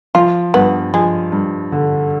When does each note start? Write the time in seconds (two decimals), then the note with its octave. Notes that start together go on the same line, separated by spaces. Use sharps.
0.15 F3 F4
0.54 G2 B3
0.94 F3 G#3
1.32 G2
1.72 D3